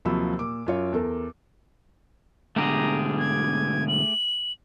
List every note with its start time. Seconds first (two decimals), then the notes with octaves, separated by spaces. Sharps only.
0.05 D#2 C3 F3 F#3 B5 E6
0.39 A#2 D6
0.66 F#2 F4 C#5
0.93 E2 A4 A#4
2.56 G#2 B2 D3 A3 G4 G#4 A#5
3.18 G#6
3.88 F#7